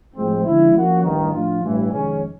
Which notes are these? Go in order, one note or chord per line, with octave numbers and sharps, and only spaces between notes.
A1 A2 F3 G#3 C4
D3 F3 G#3 C#4 E4
F3 A#3 C#4 F#4
A1 G2 D#3
A2 F3 A3 D4 F4
A1 G2 E3
F2 C3 D#3 G#3 C#4